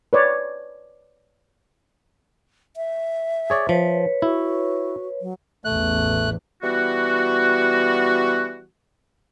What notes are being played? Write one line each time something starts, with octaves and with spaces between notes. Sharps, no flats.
B4 C#5 D5
E5
G#4 C#5 D5
F3 B4 C#5
E4 F#4
F#3
A1 E2 A3 F#6
E3 G3 B3 F#4